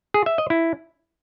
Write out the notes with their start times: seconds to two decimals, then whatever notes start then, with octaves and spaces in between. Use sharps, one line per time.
0.14 G#4
0.26 E5
0.38 D#5
0.50 E4